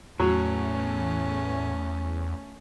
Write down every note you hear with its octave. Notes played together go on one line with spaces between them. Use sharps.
E2 A2 F#3 A3 C#4